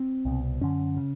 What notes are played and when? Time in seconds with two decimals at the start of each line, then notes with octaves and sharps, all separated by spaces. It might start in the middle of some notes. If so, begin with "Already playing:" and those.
Already playing: C4
0.25 C2 B2
0.61 F#2 D3 C#4
0.97 C#3